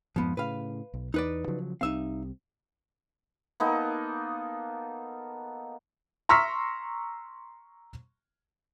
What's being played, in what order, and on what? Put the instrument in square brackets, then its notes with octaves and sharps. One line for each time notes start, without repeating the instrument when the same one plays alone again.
[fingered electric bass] F2 G#2 [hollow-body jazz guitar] F3 B3
[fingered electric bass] A2 C#3 [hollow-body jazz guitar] B4 F5
[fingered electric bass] B1
[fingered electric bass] E2 [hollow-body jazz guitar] D#4 B4 D5
[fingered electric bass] C#3 F3 F#3
[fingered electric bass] C2 G3 C4 [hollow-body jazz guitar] D#4 E5 F5
[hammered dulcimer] A#3 B3 D#4 A4
[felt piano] A#5 C6 C#6 E6 F6 B6